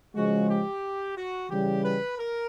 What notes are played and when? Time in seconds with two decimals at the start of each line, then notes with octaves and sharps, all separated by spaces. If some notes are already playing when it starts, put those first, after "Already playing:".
0.15 C#3 F3 G#3 F#4
0.49 G4
1.16 F#4
1.50 C#3 E3 G3 G4
1.83 B4
2.17 A#4